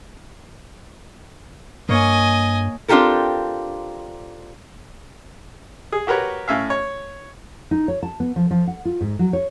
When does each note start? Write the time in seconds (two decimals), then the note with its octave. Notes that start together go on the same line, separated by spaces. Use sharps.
1.89 G2 A#3 C#5 D#5 G#5
2.88 C4 D4 F4 G4 A4 A#4
5.92 G#4
6.07 F#4 G4 A#4 B4 C#5
6.48 A2 C#4 E5 F5
6.70 C#5
7.71 D#4
7.88 C#5
8.03 A5
8.20 B3
8.36 F3
8.51 F3
8.67 F#5
8.85 F4
9.01 G#2
9.19 F#3
9.33 C#5